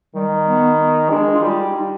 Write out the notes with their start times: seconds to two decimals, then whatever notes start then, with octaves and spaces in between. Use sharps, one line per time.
0.15 D#3 G3
0.47 B3
1.10 G#3 D4
1.33 F4
1.42 G3 D#4
1.58 F4
1.74 D#4